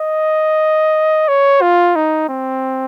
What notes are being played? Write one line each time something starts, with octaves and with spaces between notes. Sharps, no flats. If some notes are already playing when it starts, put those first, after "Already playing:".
Already playing: D#5
C#5
F4
D#4
C4